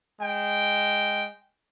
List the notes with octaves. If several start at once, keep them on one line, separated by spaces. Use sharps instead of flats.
G#3 G5